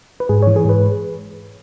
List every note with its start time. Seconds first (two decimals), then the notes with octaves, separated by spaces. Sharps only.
0.20 B4
0.29 G#2 G#4
0.43 E3 C#5
0.56 G#4
0.65 G#2 B4